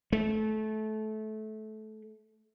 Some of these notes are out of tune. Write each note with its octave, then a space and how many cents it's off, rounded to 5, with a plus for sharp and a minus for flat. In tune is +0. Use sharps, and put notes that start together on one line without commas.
A3 -20